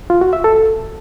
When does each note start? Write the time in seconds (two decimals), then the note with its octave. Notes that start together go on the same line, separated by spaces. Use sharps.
0.10 F4
0.21 F#4
0.33 E5
0.44 A4